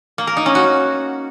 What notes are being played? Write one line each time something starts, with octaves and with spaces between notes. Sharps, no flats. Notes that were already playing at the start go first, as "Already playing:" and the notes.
A#3
A#4
D#4
C#4
F#4